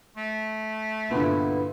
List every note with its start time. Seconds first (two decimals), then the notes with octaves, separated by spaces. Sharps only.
0.17 A3
1.11 G2 A#2 D3 B3 E4